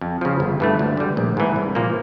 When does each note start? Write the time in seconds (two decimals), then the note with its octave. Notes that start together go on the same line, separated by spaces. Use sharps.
0.01 F2
0.21 C#3 F3
0.40 G1
0.60 G2 E3 A3
0.79 D2
0.97 D3 G3
1.17 A#1
1.37 G#2 E3
1.56 C2
1.75 A#2 F3 A#3